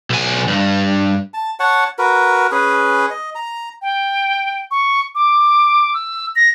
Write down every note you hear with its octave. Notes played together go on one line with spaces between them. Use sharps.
B1 G#5
G2
A5
C#5 F#5 A5
F#4 A#4 B4
C#4 G#4 B4
D#5
A#5
G5
C#6
D6
E6
A#6